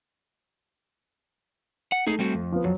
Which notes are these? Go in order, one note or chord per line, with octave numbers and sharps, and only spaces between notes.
F#5
A3 D#4 G#4
G3 C4 F#4
F2
F3 B3
F2 F#3